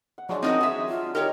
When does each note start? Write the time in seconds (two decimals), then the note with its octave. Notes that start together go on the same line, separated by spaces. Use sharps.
0.18 F#5
0.29 F3 F#3 G#3 D4 D5
0.42 D#3 C4 D#4 F4 F#4 D#6
0.60 G#4 E5
0.89 F4
1.15 D#4 G4 A#4 C#5 G5